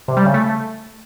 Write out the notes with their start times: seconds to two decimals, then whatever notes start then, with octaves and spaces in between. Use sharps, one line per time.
0.08 C3
0.17 G3
0.25 C#3
0.34 A3